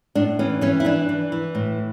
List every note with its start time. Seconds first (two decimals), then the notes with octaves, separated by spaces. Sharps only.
0.15 A2 D4
0.39 E3 C#4
0.61 E3 C#4
0.80 E4
0.85 E3 D4
1.09 E3
1.32 E3
1.55 A2